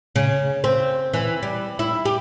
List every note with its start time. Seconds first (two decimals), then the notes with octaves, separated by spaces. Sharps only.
0.16 C#3
0.64 C4
1.14 E3
1.43 G3
1.79 E4
2.05 G4